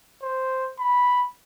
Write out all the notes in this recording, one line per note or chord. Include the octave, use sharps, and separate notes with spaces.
C5
B5